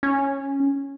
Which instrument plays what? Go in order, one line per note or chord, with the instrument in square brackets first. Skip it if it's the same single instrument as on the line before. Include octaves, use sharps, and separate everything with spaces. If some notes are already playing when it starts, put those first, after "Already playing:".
[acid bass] C#4